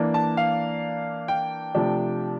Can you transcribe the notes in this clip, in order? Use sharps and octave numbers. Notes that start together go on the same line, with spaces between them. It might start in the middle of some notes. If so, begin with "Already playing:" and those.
Already playing: E3 A#3 D4
A5
F5
G5
C3 F3 A3 D4